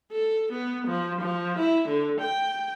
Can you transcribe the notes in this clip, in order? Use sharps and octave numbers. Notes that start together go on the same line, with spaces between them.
A4
B3
F3
F3
E4
D3
G5